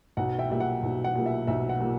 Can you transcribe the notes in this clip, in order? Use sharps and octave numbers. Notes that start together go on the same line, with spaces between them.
B1 F#5
E5 G5
A#2 G3 E5
F#5
B1
F#5
A#2 G3
E5
B1 E5
F#5
A#2 G3